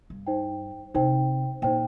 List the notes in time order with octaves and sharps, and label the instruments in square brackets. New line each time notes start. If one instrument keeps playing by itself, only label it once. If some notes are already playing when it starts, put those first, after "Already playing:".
[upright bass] G2
[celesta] D#4 C5 G5
[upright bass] C3 [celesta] D#4 C5 G5
[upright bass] A#2 [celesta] D#4 C5 G5